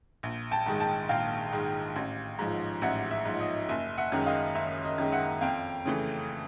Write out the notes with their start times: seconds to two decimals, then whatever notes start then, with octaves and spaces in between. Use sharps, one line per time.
0.23 A#1
0.51 G5 A5
0.66 G#2 D#3 G#3
0.80 G5 A5
1.09 A#1 F5 G5
1.53 G#2 D#3 G#3
1.96 A1
2.39 G#2 F3
2.82 A1 E5 F#5
3.11 E5
3.25 G#2 F3
3.40 D#5
3.69 F#1 E5
3.98 E5 F#5
4.12 F#2 D#3 G#3
4.26 D#5 F5
4.55 F#1 E5
4.85 D#5
4.98 F#2 D#3 G#3
5.12 E5 F#5
5.41 F2 F5 G5
5.85 C#3 E3 A3